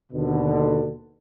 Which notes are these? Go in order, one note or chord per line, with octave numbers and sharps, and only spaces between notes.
D#2 B2 D3